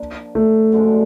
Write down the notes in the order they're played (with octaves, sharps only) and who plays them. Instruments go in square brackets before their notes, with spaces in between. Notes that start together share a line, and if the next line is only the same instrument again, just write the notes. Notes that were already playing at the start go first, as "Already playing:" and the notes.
Already playing: [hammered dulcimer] F3 A#3 D4
[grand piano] A3
[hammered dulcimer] F#2 D3 F3 G#3